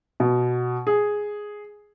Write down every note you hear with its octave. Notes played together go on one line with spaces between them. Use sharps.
B2
G#4